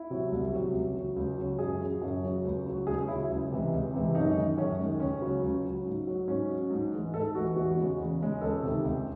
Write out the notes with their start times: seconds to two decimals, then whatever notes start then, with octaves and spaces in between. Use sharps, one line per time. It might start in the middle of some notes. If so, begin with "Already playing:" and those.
Already playing: E4
0.10 C3 F#3
0.32 C2
0.52 C3 F#3
0.74 C#2
0.95 C#3 F#3
1.16 C#2
1.38 C#3 F#3
1.59 F#2 G#4
1.81 C#3 F#3
2.02 F#2
2.23 C#3 F#3
2.45 C#2
2.66 C#3 F#3
2.87 C#2 G#4
3.08 C#3 F#3 E4
3.30 C#2
3.51 C3 E3 G#3
3.73 C#2
3.93 C3 E3 G#3
4.15 F#2 D#4
4.36 D#3 G#3
4.58 F#2 C#4
4.80 D#3 G#3
5.00 C#2 C#4
5.22 C#3 F#3
5.43 C#2
5.65 C#3 F#3
5.86 G#2
6.07 F#3
6.28 G#2 C#4
6.50 F#3
6.70 G#2
6.92 E3 G#3
7.13 G#2 A4
7.35 E3 G#3 F#4
7.56 E2 F#4
7.77 C#3 G#3
7.99 E2
8.21 C#3 G#3
8.41 C#2 A4
8.62 C3 D#3
8.84 C#2